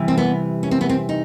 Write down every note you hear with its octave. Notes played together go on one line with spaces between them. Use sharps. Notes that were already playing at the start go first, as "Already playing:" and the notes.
Already playing: C3 E3 G3
C4
B3
C#4
C4
B3
C4
D#4